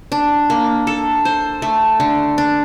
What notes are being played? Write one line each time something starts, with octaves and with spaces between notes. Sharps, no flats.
D4
A#3
A4
C5
A3
D3
D4